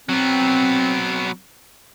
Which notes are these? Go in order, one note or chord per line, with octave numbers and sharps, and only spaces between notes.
F#3 B3 C4